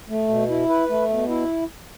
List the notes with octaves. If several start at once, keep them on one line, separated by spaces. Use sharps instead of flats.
A3
B2
E4
B4
A3
B2
E4